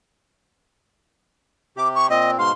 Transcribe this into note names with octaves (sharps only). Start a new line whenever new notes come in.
C3 G4 D6
C#6
A#2 C4 D#5
G#2 B2 F5 C6